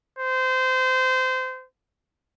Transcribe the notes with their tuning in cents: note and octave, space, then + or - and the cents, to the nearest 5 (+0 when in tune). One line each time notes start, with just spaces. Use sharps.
C5 -25